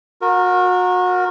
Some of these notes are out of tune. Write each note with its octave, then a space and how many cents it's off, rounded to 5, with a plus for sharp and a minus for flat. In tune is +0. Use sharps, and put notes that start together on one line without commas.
F#4 -30 A#4 +0